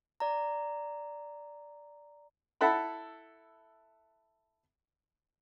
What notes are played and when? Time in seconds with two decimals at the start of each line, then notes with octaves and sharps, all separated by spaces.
0.20 D5 A#5
2.61 E4 A4 F#5 B5